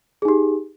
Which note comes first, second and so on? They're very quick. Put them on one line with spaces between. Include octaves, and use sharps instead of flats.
G#4 D#4 G4